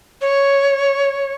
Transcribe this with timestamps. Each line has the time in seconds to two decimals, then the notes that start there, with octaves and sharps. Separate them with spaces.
0.21 C#5